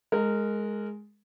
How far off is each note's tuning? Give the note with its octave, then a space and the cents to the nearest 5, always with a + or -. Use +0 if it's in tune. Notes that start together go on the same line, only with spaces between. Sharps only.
G#3 +5 A#4 -20